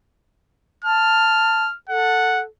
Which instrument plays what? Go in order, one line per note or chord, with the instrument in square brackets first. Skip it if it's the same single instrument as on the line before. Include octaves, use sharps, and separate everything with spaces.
[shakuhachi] A5 [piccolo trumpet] F6
[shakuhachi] A4 [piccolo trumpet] F#5